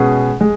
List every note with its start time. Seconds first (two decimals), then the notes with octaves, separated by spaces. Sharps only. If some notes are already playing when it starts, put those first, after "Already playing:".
Already playing: B2 G#3 C#4 G#4 B4
0.41 G#3